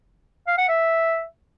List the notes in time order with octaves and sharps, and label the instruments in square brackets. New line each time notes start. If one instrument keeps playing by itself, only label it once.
[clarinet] F5
F#5
E5